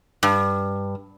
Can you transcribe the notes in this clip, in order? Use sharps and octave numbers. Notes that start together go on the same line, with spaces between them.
G2